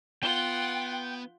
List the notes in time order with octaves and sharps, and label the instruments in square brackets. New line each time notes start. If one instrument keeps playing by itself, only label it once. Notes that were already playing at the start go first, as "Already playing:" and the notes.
[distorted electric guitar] B3 [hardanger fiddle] F4 F#5 [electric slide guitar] G5 [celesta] G7